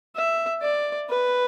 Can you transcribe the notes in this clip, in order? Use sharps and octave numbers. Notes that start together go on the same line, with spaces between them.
E5
D5
B4